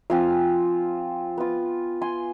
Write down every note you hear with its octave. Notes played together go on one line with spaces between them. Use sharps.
F3 C4 F4 F5 G#5
B3 F4
G#5 C6